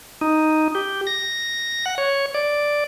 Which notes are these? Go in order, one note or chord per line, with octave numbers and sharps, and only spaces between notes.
D#4
G4
A#6
F#5
C#5
D5